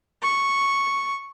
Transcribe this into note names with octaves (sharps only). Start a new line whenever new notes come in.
C#6